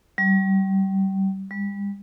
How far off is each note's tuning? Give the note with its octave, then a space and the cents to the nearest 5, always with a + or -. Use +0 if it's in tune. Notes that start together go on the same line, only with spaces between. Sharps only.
G3 -30
G3 +40